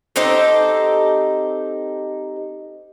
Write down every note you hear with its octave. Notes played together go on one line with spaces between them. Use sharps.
C4 D#4 G4 A4